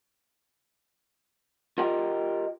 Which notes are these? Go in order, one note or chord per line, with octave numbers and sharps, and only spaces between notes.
F4 G4 A#4 D#5 G5